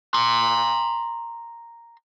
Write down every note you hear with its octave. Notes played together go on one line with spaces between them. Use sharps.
A#5 C6